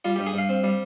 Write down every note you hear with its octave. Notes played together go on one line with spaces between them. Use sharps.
G3 F4
G4
G2
G#4
G2 F5
C4
G3